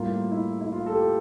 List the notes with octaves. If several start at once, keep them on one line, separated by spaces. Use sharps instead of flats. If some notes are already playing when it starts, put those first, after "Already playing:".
Already playing: A2 G3 A#3 F4
E4
E4
F4
A4
G4